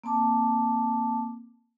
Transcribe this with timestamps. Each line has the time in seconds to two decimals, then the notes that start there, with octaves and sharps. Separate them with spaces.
0.04 A#3 C4 A5 D6